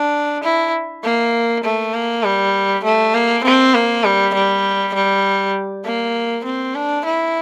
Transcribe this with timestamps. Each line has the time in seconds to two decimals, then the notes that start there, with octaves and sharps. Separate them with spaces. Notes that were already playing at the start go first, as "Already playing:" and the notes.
Already playing: D4
0.44 E4
1.04 A#3
1.64 A3
1.94 A#3
2.24 G3
2.84 A3
3.14 A#3
3.44 C4
3.74 A#3
4.05 G3
4.34 G3
4.94 G3
5.85 A#3
6.45 C4
6.75 D4
7.05 E4